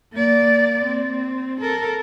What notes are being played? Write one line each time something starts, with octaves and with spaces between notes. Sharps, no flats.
A#3 D5
C4
A4 A#4